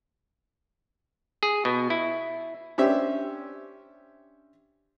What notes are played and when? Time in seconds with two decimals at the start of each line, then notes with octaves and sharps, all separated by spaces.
1.43 G#4
1.65 B2
1.90 E4
2.78 C#4 D4 G4 C5 E5